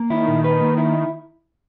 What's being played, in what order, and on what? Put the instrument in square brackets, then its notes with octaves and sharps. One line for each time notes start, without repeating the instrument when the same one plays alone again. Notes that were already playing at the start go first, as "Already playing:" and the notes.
Already playing: [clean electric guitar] A#3
[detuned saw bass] D#3 [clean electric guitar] E4
[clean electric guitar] A#2
B4
A#3
E4